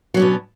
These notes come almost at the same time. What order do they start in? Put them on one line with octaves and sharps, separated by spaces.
F#3 C#4 D4 B2